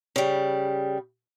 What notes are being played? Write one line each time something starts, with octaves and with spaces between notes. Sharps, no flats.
C#3 G3